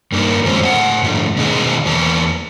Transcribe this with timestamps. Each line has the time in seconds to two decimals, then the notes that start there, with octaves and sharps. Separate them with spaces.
0.12 G2 A#3 D#4 A#4
0.44 F#2 E3 G#3 C4 C#4 F4
0.62 A2 F5 F#5
1.03 G#2 F3 A3
1.37 B2 D#3 D4 G#4 D#5
1.85 E2 E3 A#3 A5